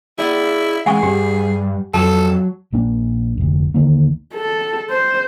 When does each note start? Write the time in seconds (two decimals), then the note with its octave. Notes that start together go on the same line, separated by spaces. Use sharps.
0.19 E4 G#4 D5
0.86 E3 G#3 G#4 F#5 G#5 C#6
1.03 G2 G3 G4
1.94 F2 F#3 A4 A5
2.73 A#1 A#3 D4
3.38 F1 D2
3.74 D#2 D3 D#3 A#3
4.34 A4
4.90 C5